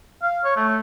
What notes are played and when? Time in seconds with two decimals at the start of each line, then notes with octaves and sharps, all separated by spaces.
0.22 F5
0.44 C#5
0.56 A3